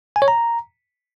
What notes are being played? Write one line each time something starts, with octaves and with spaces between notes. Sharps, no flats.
G#5
C#5
A#5